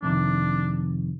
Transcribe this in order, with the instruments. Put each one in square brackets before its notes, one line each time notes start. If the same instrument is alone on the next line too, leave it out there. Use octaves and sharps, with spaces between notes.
[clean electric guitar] F2 C3 D#3 [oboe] D4